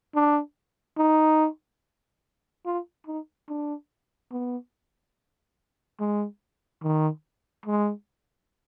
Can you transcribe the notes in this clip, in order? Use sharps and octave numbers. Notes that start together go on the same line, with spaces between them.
D4
D#4
F4
D#4
D4
B3
G#3
D#3
G#3